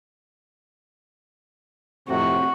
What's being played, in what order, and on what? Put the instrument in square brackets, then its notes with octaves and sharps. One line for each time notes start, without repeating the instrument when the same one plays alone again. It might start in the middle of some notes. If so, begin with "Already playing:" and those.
[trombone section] F2 A2 C3 [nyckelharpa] F#4